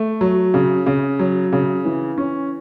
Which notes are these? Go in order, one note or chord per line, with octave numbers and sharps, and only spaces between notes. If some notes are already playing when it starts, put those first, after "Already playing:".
Already playing: A3
F#3
C#3
C#3
F#3
C#3
E3
C#4